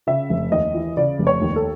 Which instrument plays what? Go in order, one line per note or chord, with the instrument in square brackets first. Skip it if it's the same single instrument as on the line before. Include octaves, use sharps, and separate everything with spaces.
[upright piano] C#3 E5
F1
D#2 D#5
E3
C#3 D5
F1
C#5
D#2
A4